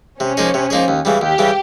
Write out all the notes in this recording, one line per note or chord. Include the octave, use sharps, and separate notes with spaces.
C3 C#4
F3 A#3 D#4 G#4
C3
F3 A#3 D#4 G#4
D#2
C#3 E3 G3
D#2 G4
C#3 E3 G3